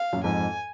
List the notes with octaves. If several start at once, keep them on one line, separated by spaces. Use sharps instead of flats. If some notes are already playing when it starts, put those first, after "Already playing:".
Already playing: F5
F#2 A#2
F2 G#2 G#5